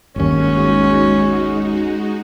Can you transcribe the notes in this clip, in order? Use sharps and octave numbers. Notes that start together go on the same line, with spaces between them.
G1 D#2 G#3 C#4 D#4 F#4